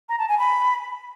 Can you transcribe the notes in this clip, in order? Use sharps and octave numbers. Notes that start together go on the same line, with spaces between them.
A#5
A5
G#5
B5